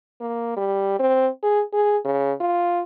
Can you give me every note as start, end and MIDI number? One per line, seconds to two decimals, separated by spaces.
0.21 0.52 58
0.57 0.95 55
0.99 1.28 60
1.43 1.62 68
1.73 1.97 68
2.05 2.33 49
2.40 2.83 65